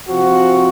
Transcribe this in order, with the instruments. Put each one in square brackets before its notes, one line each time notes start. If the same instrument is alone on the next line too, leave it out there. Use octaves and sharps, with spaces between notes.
[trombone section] C3 F3 C4 F#4